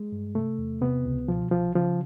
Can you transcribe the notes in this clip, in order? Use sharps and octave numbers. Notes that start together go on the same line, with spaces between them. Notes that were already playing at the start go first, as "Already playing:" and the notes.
Already playing: G#3
G2
C3 A3
E2
C3 B3
C#2
B2 F3
C2 F3
C#3 F3